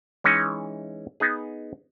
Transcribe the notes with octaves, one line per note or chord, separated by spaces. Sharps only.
E3 G#3 C#4 D#4
B3 D#4 G#4